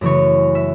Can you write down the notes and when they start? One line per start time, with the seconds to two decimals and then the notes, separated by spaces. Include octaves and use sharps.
0.01 F#2 C#3 E3 A3 C#5
0.55 E5